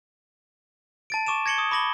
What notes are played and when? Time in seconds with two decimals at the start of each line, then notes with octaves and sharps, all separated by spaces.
1.10 A5 A6 D7
1.27 C#6 D6 D#7 E7
1.46 G#6 A#6 C#7 F#7 G7
1.58 D#6
1.71 B5 D6 A#6 F#7 G7